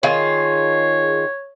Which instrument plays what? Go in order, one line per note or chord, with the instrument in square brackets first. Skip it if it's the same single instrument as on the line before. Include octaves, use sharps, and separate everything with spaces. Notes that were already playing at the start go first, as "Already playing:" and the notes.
[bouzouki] D#3 F4 G#4 [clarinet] C#5